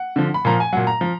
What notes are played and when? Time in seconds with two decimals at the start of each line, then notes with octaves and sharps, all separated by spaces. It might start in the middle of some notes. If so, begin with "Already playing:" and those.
Already playing: F#5
0.16 D3 F3
0.34 B5
0.45 A#2 F3 A#5
0.60 G#5
0.73 A#2 F#3 F#5
0.87 A#5
1.01 F3